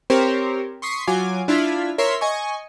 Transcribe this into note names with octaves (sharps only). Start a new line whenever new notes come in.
C4 G4 A#4 C5 C#5
C6 C#6 D#6 B6 C7
F#3 F4 G#5 D6
D4 E4 F4 F6 G#6 B6
A#4 C#5 E5 C6 B6
D#5 G#5 C#6